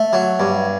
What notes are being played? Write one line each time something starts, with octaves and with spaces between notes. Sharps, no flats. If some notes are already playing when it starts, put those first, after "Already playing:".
Already playing: A3
F#3
G2